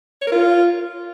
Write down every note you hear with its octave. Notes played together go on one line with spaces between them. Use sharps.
C#5
A#4
F4